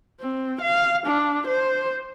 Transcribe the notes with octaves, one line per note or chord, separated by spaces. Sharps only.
C4
F5
D4
C5